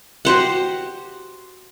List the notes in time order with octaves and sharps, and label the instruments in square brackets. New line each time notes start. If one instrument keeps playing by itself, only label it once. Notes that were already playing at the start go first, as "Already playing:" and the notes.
[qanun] F#4 G4 C5 F#5